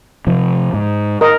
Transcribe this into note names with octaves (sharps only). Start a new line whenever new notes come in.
C3 F3
G#2
A#4 D#5